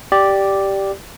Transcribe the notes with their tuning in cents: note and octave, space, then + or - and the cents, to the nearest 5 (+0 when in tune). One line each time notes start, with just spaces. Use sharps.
G4 -5 D5 +0